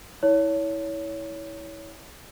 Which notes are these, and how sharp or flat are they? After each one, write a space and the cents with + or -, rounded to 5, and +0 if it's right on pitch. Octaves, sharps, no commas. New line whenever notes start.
E4 -25 C#5 +20